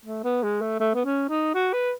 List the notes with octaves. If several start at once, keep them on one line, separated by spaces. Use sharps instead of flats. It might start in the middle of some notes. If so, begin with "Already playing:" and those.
A3
B3
G#3
A3
A3
B3
C#4
D#4
F#4
B4